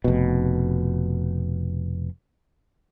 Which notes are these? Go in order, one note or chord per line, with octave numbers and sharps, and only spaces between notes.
F1 B2